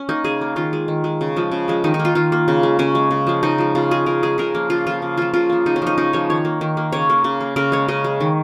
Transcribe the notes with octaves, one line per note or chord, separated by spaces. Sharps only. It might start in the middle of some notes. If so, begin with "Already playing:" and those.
Already playing: C#4
A#3 D#4
C#3 G#4
A#3
D#3 F4
G#3
D#3
G#3
C#3
F3 G#3
C#3
F3 G#3
D#3 D#4
D#4
A#3
F4
D#3 F4
A#3
C#3
G#3
C#3 C#4
G#3
C#3
F3 G#3
C#3 D#4
F3 G#3
C#3 F4
G#3 G#4
C#3 A#4
G#3 G#4
C#3 A#4
F3 A#3
C#3 F4
F3 A#3 F4
C#3
F3 A#3 F4
C#3 F4
F3 A#3
C#3 D#4
C#4
F3 A#3 D#4
C#3 D#4
F3 A#3 C#5
D#3 C#5
A#3
D#3
A#3
C#3 C#5
A#3
C#3
A#3
C#3 A#4
G#3 C#5
C#3 D#5
G#3
D#3